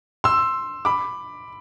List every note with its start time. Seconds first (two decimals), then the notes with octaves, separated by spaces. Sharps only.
0.24 C6 E6
0.85 B5 D6